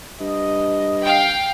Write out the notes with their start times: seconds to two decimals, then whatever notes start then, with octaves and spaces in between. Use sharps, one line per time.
0.20 G2 D#5
1.03 F5 G5